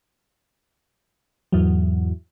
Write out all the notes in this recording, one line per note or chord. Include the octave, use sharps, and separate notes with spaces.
E2 G#2 E3 F#3